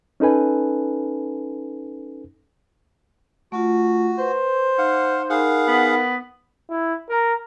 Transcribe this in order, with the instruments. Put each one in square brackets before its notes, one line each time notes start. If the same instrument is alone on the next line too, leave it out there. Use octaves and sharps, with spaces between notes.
[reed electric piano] C#4 D#4 A4 B4 G#5
[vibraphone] A3 F4 [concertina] F#4
[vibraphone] B4 [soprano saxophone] C5
[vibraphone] D#4 [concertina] F5 F#5
[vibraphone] D#4 A#4 B5 [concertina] G#4 F5 F#5
[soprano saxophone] B3
[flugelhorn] E4
A#4